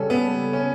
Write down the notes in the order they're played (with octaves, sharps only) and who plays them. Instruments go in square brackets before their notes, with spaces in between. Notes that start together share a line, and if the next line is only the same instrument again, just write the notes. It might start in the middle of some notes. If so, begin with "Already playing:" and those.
Already playing: [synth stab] C#3 G3 A4 [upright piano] C#4
[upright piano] B3
C#4